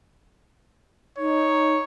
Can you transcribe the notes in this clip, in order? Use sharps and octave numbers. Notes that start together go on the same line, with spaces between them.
D#4 C#5